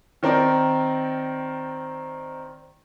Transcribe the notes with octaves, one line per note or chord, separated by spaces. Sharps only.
D#3 C4 A#4 D5